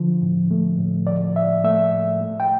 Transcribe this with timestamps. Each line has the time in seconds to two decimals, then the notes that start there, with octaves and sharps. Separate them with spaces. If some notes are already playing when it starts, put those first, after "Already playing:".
Already playing: D3 F3
0.22 A2
0.51 A3
0.79 A2
1.07 F3 D5
1.35 A2 E5
1.64 A3 E5
1.92 A2
2.22 A3
2.40 G5